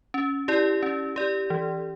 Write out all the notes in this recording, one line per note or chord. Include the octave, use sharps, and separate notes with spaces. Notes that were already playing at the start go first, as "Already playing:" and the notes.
C#4
E4 G4 D5
C#4
G4 D5
E3